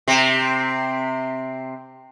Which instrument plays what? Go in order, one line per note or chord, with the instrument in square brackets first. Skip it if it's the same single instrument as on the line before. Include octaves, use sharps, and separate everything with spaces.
[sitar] C3 C4